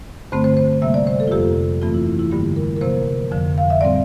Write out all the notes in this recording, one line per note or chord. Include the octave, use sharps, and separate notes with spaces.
G2 D3 A3 C4 C5
C5
C5
C3 G3 A#3 E5
D5
C5
A4
F4
F2 C3 F3 A#3 G4
G2 E3 A3 C4 F4
E4
E4
E4
G2 D3 G3 A#3 G4
A#4
A#4
C3 F3 A#3 C5
F2 D3 F3
F5
E5
A2 G3 C4 D5